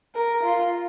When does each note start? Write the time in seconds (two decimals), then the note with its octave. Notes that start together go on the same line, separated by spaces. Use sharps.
0.15 A#4
0.44 F4